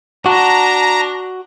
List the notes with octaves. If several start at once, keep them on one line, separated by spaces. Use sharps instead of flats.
D4 F#4 A5 A#5